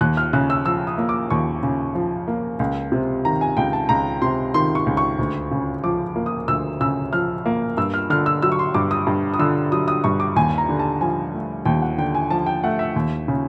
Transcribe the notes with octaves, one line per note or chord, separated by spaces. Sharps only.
D#2 F#6
F6
C#3 F#6
E6
F3 E6
D#6
A#3
D6
D#2 C#6
C#3
F3
A#3
C#2
C3
D#3 A#5
G#5
C#2 G5
A5
C#2 A#5
C3 C6
D#3 C6
C#6
C#2
C#6
D2
C#3
F3 D6
A#3
D#6
D2 E6
C#3 E6
F3 F6
A#3
G2 E6
F6
D3 F6
E6
F#3 E6
C#6
C6
G2 D6
D#6
G2
D#6
D3 E6
F#3 D#6
D#6
G2 C#6
D6
D#2 G#5
A#5
D3
A5
F3 G#5
A3
D#2 G5
F#5
D3 G5
G#5
F3 A5
G5
A3 F#5
E5
D#2
C#3